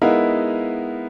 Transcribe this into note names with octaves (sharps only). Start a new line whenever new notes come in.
G#3 B3 D#4 E4 A#4 F5